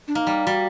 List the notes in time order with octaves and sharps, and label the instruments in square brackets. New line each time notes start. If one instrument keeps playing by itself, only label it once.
[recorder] D4
[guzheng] A#3 [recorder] D#4
[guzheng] G3
[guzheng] G3 [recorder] F#4